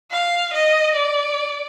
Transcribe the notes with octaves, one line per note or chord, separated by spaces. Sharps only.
F5
D#5
D5